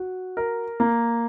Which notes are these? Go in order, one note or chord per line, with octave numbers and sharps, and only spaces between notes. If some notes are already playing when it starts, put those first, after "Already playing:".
Already playing: F#4
A#4
A#3